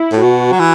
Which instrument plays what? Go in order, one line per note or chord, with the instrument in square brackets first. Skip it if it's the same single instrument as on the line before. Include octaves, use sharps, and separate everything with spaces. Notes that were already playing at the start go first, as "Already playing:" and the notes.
Already playing: [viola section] E4
[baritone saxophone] A2
[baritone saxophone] B2 [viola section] F#4
[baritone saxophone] F#3
E3